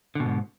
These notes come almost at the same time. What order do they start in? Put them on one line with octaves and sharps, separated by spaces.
D3 B2 G#2